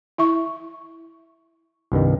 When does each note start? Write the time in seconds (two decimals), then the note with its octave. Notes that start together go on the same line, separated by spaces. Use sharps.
0.18 E4 E5 C#6
1.92 C2 G2 D#3